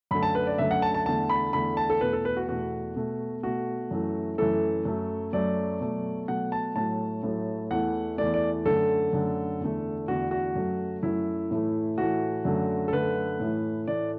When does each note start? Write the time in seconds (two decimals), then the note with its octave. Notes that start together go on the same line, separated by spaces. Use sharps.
0.11 F#2 D3 A3 B5
0.23 A5
0.35 B4
0.47 D5
0.58 F#2 D3 A3 E5
0.71 F#5
0.82 A5
0.94 A5
1.06 E2 D3 A3 A5
1.30 B5
1.53 E2 D3 A3 B5
1.77 A5
1.90 A4
2.01 E2 B2 A3 B4
2.13 A4
2.25 B4
2.37 F#4
2.48 E2 B2 A3 F#4
2.96 B2 A3
3.43 B2 A3 F#4
3.91 F#2 E3 A3
4.38 F#2 E3 A3 A4
4.85 F#2 F#3 A3
5.33 F#2 F#3 A3 D5
5.81 B2 F#3 A3
6.28 B2 F#3 A3 F#5
6.52 A5
6.75 A2 F#3 A3 A5
7.23 A2 F#3 A3
7.71 E2 E3 A3 F#5
8.18 E2 E3 A3 D5
8.34 D5
8.66 F#2 D3 A3 A4
9.13 F#2 D3 A3
9.60 E2 D3 A3
10.08 E2 D3 A3 F#4
10.31 F#4
10.56 F#2 F#3 A3
11.03 F#2 F#3 A3 E4
11.51 A2 E3 A3
11.97 A2 E3 A3 F#4
12.45 F#2 D3 A3
12.88 A4
12.93 F#2 D3 A3 B4
13.40 A2 E3 A3
13.87 A2 E3 A3 D5